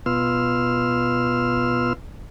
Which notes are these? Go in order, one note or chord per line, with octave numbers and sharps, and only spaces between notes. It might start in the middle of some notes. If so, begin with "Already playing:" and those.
B2 B3 F4 C6 E6 F6